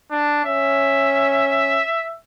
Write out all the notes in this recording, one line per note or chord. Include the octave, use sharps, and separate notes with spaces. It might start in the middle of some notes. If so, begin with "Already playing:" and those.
D4
C#4 E5